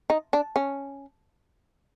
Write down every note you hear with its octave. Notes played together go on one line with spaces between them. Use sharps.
D#4
D4
C#4